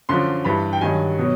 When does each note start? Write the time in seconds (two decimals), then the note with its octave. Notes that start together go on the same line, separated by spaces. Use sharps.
0.09 F#2 D3 F3 C6
0.45 G2 E3 G3 B5
0.73 G5
0.81 G2 D#3 F#3 G#5
1.18 B2 F#3